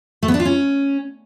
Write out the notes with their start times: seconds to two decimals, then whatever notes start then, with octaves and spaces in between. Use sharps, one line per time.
0.23 A3
0.28 B3
0.34 D4
0.40 F4
0.45 C#4